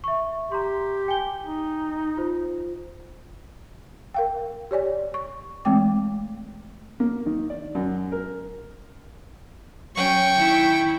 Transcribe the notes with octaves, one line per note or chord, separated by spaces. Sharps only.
E5 C#6
G4 A#5 C6
G5 G#5 G7
D#4
F4 C5
A#4 F5 G5
G4 C#5 D5 G#5
C#6
E3 G#3 A3 C4 G5 D6
A#3
D#3
D5
F#2
A#4
F#3 C#4 G5 C#6
D#3 E4